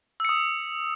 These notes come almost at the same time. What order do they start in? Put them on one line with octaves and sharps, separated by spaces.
E6 C#7 D#6